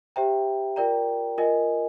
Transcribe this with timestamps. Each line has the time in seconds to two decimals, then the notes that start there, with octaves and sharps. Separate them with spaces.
0.16 G4 C5 E5 G5 A#5
0.76 F4 A#4 D5 G5 A#5
1.38 F4 A#4 D#5 G#5